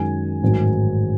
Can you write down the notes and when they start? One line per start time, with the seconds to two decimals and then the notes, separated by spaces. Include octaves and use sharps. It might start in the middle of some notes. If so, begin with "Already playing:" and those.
Already playing: F#2 D#3 G#3 G#5
0.42 A1 G#2 D#3 F#3